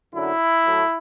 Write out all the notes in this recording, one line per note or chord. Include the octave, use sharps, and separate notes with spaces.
F#2 D3 F#3 E4
A2 F#3 A3